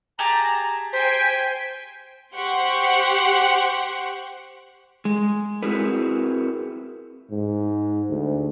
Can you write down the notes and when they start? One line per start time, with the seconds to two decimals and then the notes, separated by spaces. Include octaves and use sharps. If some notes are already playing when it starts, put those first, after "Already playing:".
0.19 G4 G#4 A5 A#5
0.93 C5 G5 G#5 B6 D7
2.35 G4 C5 F#5 C6 C#6
5.05 G#3
5.63 C4 E4 F#4 G#4 A#4 B4
7.31 G#2
8.10 D2